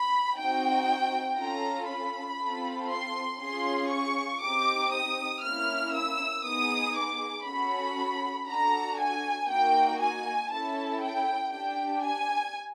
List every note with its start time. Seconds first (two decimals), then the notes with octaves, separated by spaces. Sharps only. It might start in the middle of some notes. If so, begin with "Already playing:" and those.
Already playing: B5
0.37 C4 D#4 F#4 G5
1.38 C#4 F4 A4 A#5
1.89 B5
2.40 C4 F4 A4
2.91 C6
3.41 C#4 F4 G#4 C6
3.91 C#6
4.42 C4 D#4 G4 D6
4.93 D#6
5.43 A#3 C#4 E4 F6
5.94 E6
6.45 B3 D#4 G#4 D#6
6.96 D6
7.47 C#4 F#4 A4 B5
8.48 D4 F#4 A4 A#5
8.99 G#5
9.49 A#3 D#4 F#4 G5
10.00 G#5
10.50 C#4 E4 A4 A5
11.01 G5
11.52 D4 G4 G5
12.03 G#5